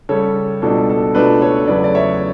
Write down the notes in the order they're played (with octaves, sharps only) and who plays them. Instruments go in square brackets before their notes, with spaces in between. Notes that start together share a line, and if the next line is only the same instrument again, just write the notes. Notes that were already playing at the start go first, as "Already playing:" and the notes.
[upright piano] C#3 G3 C#4 A4 C#5
C#2 B2 G3 D4 A4
A4
C#2 B2 A3 D4 B4
A4 C#5
E2 C#3 F#3 A3 B4 D5
D5
C#5 E5